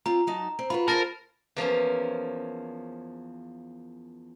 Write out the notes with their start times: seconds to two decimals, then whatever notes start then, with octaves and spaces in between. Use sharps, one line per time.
0.06 C4 F4 A#5
0.27 F#3 D#4 A5
0.59 C4
0.70 F4 F#4 B4 B5
0.88 F4 G#4 A#4 C5 A5 A6 A#6
1.56 E2 F3 A#3 C#4